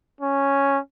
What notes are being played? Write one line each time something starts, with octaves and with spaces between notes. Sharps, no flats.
C#4